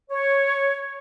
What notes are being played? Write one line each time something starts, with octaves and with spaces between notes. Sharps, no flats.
C#5